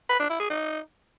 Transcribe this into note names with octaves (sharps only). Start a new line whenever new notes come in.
B4
D4
E4
G#4
D#4